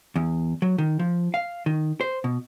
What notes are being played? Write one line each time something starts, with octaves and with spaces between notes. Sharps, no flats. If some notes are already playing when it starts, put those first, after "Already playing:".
E2
F#3
D#3
F3
F5
D#3
C5
B2